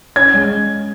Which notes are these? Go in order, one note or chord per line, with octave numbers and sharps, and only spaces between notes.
C#4 G#6
G#3